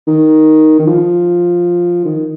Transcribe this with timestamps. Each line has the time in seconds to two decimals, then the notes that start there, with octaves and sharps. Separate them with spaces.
0.07 D#3
0.79 D#3
0.87 F3
2.05 D#3